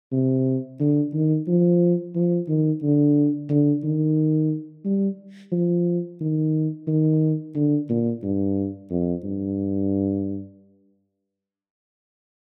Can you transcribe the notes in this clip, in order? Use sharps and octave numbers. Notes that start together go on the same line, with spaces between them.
C3
D3
D#3
F3
F3
D#3
D3
D3
D#3
G3
F3
D#3
D#3
D3
A#2
G2
F2
G2